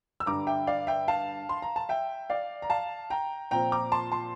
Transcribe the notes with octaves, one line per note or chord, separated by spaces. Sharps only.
E6
G2 D3 G3 A#5 D6
E5 G5
D5 F5
E5 G5
F5 A5
C6
A#5
A5
E5 G5
D5 F5
A#5
F5 A5
G5 A#5
A#2 F3 C4 G5 A#5
A#5 D6
A5 C6
A5 C6